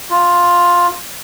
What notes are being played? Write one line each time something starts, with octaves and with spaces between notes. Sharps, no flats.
F4